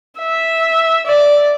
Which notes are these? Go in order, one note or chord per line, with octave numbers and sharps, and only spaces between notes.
E5
D5